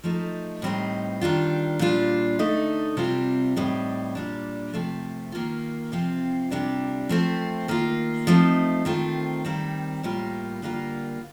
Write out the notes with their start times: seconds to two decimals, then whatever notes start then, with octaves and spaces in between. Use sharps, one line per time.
0.04 F3 A3 D#4
0.62 A2 G3 C4 D#4
1.21 D#3 G3 D4 F4
1.79 A#2 G3 D4 F4
2.39 D3 A3 D#4
2.97 C3 G3 C4 F4
3.56 A2 G3 C4 D#4
4.15 A#2 G3 D4
4.73 C3 F3 A3
5.32 D#3 A#3 F4
5.92 C3 F3 C4 F4
6.50 C3 G3 D4 F4
7.09 F3 A3 C4
7.68 D#3 A#3 F4
8.27 F3 A3 C4 D#4
8.85 D#3 A3 C4 F4
9.45 D#3 G3 C4
10.03 A2 G3 A#3 F4
10.62 D3 G3 A#3 F4